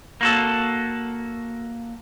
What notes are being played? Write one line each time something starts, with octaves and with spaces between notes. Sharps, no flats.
A#3 F#4 A4